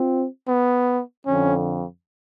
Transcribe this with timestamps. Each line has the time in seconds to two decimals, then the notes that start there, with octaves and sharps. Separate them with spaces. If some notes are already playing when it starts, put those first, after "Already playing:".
Already playing: C4 F4
0.48 B3
1.26 F2 D3 C#4